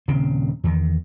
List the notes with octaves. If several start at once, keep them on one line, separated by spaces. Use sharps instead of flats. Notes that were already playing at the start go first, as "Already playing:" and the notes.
D#1 C#3 C4
E2 D#3